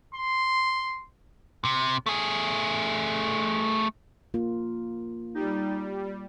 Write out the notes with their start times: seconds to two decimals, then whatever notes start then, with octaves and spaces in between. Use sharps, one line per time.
0.15 C6
1.65 C3
2.06 A3 G#4
4.34 A#3 F4
5.35 G3 D#4